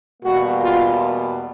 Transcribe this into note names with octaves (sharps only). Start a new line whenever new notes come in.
E2 B2 G3 A#3 F#4
F4